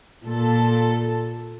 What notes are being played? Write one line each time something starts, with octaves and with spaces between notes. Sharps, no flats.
A#2 A4